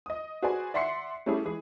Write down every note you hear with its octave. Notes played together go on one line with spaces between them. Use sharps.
D#5 D#6
F#4 G#4 B4 C5 D5 G#5
D5 E5 F#5 C6 C7 C#7
G3 A3 C#4 E4 G4 G#4
E3 G#3 G#4